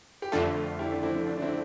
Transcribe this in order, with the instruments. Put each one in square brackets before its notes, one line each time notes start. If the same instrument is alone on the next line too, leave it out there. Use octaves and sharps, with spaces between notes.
[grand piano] G4
[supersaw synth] F2 D3 A3 [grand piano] F4 A4
[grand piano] E4 G4
D4
C4 E4
C4
D4
D4
C4 E4